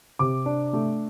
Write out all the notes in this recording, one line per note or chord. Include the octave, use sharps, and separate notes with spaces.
C3 D6
D4
A3